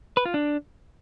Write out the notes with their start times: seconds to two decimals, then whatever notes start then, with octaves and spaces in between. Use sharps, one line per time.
0.17 B4
0.25 F4
0.34 D4